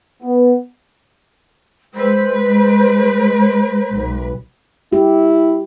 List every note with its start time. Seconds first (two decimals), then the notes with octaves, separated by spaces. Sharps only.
0.22 B3
1.95 G#3 B4 C5
3.92 B1
4.93 E4 G4